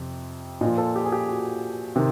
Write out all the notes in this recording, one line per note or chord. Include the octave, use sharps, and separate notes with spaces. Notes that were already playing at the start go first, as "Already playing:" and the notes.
Already playing: F2 C3
A#2 F3 D#5
A4
G4
G#4
G4
F#4
C3 D#3